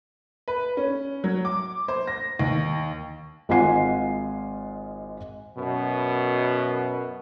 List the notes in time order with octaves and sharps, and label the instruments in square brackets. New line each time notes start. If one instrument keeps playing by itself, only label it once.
[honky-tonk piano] B4
C#4
F#3
D6
C5
A#6
D#2
[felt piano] G#1 G#3 F4 F#5 G#5 C7
[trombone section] F#2 B2